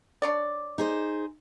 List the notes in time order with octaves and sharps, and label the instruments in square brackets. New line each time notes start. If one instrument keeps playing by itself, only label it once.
[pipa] D4 C#5 D5
[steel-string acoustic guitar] D#4 G#4 C5